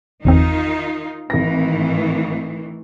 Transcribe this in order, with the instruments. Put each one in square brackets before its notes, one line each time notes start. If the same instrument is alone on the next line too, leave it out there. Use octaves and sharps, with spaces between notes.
[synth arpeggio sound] G1 E2 C4 [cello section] D#3 D#4 F4
[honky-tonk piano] G#1 A#6 [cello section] A2 D#3 E3